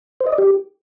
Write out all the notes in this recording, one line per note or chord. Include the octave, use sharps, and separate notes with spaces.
C5
D#5
D5
G4